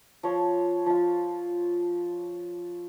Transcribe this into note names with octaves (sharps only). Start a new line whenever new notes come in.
F3 C#5 C6
F3 F4